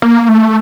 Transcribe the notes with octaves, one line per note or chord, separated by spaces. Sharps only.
A#3
A3